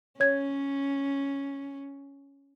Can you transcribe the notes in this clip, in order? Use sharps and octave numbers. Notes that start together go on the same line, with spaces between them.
C#4 C#5 G#6